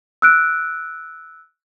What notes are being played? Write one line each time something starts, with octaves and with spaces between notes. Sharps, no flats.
E6 F#6 D7